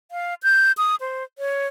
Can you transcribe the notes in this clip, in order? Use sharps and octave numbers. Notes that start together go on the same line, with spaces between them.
F5
G6
D#6
C5
C#5